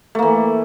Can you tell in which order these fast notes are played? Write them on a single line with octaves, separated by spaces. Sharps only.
A3 A#3 E3